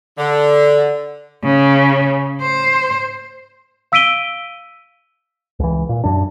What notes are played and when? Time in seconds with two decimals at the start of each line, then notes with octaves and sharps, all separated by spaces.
0.18 D3
1.43 C#3
2.42 C5
3.92 F5 E6 B6 D7 D#7 G7
5.60 C#2 E3
5.89 A#2
6.04 F#2 D4